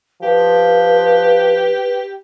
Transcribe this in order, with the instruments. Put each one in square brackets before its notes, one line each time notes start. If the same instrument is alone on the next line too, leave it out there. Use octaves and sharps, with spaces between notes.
[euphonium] F3 [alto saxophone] G4 [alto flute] B4